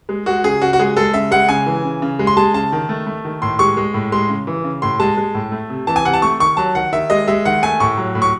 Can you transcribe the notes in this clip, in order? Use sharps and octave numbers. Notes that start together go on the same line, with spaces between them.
G#3
G#3 F#4
C#3 G#4
C#3 F#4
F#4
G#3 G#4
G#3 A4
C#3 E5
G#3 F#5
C#3 G#5
E3
C#3
C#3
G#3
C6
G#3 A5
C#3 A5
D#3
A3
A3
D#3
A2 C6
G#3 C#6
G#3
A2
G#3 C6
C#3
E3
C#3
A2 C6
G#3 A5
G#3
A2
A3
C3
E3 A5
G#5
C3 F#5
A5
A3 C#6
D#3 C#6
F#3 A5
D#3 F#5
D#3 E5
G#3 D#5
G#3 E5
D#3 F#5
A3 G#5
A2 C#6
F#3
A2
C#6